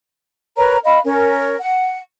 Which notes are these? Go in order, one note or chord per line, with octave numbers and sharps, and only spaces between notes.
A#4 B4 C#5 A#5
D#5 F5 B5
C#4 A#4
F#5